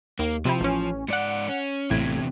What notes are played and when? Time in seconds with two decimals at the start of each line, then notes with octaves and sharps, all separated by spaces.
0.19 D#2 A#3
0.45 C3 F3 C4 E4
0.61 A1 C#4
1.08 G#2 D5 F#5 C#7
1.48 C#4
1.90 A1 E2 A2 C3 G#6